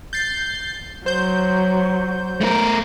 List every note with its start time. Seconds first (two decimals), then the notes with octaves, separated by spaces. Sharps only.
0.13 G6 A6 C7
1.06 F#3 C5 G6
2.41 A3 A#4